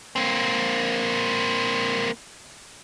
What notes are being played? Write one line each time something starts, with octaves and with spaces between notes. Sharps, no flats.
A#3 C4